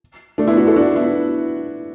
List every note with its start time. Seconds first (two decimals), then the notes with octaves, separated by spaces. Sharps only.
0.38 A3 D4
0.48 B3 E4
0.57 D4 F#4
0.67 E4 A4
0.76 D4 F#4
0.95 B3 E4